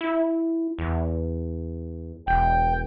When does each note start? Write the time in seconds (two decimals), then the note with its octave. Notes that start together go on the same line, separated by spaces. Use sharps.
0.01 E4
0.79 E2
2.27 E1 G5